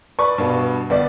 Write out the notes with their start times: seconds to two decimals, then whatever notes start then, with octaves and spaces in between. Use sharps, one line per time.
0.19 B4 D5 C#6
0.38 G2 B2 B3
0.90 G1 B3 D5